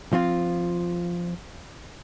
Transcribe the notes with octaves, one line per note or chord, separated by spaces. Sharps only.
F3 C4 F4